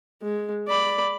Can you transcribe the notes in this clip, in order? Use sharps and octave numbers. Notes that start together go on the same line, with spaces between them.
G#3
D5 B5